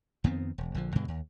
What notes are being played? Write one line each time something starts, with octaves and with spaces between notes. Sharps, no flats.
F2 D#3 B3 C4
E1
A#1 D3 F3
G2 B2 D3 G#3
D#2